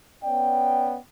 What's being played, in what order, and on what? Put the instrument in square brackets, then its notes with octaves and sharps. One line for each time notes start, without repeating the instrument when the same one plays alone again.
[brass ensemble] B3 C#4 D5 G5